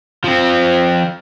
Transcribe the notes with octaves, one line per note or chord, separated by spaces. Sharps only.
F3 C4